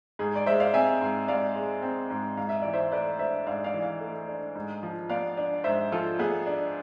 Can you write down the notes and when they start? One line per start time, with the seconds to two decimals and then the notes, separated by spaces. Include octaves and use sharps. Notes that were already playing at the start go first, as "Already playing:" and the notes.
0.19 G#2 G#4
0.36 D5
0.46 G#3 C5 E5
0.60 D5 F5
0.74 C4 E5 G#5
1.01 G#2
1.28 G#2 D5 F5
1.56 G#3
1.82 C4
2.10 G#2
2.37 G#2 F5
2.49 E5
2.62 E3 D5
2.73 C5 E5
2.92 A3 B4 D5
3.19 D4 C5 E5
3.47 G#2 D5 F5
3.64 D5 F5
3.74 E3
3.82 D5 F5
4.01 A3
4.28 D4
4.55 G#2
4.83 F3
5.10 B3 D5 F5
5.37 D4
5.64 G#2 C5 E5
5.92 F3 F4 A4
6.19 B3 G#4
6.47 D4